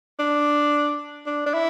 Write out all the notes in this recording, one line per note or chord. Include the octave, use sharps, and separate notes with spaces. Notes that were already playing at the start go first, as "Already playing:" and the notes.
D4
D4
D4
E4